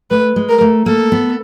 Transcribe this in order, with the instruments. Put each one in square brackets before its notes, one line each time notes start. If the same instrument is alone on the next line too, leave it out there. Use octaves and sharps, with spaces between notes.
[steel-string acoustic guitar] A3 [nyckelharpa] B4
[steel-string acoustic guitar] G#3
[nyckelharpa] A#4
[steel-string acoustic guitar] A3
[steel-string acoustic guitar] A#3 [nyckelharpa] A4
[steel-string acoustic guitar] B3